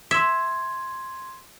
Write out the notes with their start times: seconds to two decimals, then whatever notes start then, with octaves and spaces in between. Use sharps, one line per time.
0.11 E5 C6 G#6